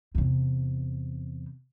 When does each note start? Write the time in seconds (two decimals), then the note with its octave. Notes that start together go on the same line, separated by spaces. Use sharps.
0.15 E2 C3